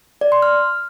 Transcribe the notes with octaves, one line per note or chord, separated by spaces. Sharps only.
D5
C6
F6